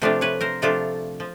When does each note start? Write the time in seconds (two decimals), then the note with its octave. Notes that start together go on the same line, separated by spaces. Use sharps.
0.02 C3 F3 A3 D4 F4
0.21 B4 C#5
0.41 A#4 C5
0.62 C3 F3 A3 D4 F4
1.20 F3